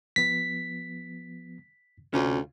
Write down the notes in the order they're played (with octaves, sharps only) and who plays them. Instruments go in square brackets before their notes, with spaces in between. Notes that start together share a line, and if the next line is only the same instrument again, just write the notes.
[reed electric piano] F3 B3 [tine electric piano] B6
[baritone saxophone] D2 [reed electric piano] C3 [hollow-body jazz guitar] C#4 F4